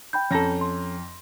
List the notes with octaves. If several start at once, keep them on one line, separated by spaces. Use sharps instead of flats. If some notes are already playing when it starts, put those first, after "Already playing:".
G5 B5 G6
F2 C#4 A4 A#5 A#6
C6